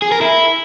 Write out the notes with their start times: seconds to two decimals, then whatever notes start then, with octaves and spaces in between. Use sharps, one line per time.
0.02 G#4
0.12 A#4
0.21 E4